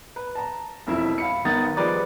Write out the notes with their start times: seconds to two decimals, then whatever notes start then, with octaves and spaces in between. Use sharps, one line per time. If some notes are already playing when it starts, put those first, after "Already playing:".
0.16 B4
0.35 A5 A#5
0.87 E1 F2 E4 E5
1.18 F5 B5 C#7
1.45 G1 D#3 B3 A#5 D#6 A6
1.77 F3 G3 G#3 B4 D5